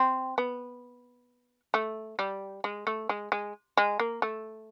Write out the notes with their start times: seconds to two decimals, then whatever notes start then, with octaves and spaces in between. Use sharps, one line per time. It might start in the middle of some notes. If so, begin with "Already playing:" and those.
Already playing: C4
0.38 B3
1.74 A3
2.19 G3
2.64 G#3
2.87 A3
3.09 G#3
3.32 G#3
3.77 G#3
4.00 A#3
4.22 A3